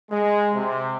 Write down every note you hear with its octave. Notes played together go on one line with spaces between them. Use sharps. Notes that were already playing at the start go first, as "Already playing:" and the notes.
G#3
C3